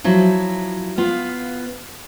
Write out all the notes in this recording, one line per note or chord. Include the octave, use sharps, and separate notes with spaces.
F3 F#3 E4
B3 F4 F5